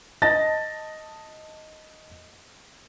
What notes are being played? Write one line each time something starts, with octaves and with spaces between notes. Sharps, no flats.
D#5 A5 A6 A#6